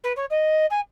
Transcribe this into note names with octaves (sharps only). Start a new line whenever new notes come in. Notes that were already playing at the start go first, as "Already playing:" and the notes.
B4
C#5
D#5
G#5